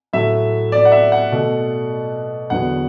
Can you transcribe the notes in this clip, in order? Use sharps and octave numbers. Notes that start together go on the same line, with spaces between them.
A2 F#3 A3 E5
D5
F#5
E5
F#5
B2 A3
E2 D3 F#3 B3 F#5